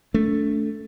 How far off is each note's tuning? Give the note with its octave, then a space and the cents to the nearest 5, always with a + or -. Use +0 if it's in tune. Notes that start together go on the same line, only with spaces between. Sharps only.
A3 +0 D4 -35